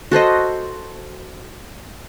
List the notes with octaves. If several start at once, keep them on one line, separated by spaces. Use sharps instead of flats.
F#4 A4 C5 D#5